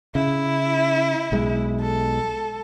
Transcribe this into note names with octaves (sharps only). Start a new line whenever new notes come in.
C#3 E4
B1 G#3
A4